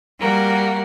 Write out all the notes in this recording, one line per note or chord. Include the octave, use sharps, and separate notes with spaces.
G3 A#3 F#4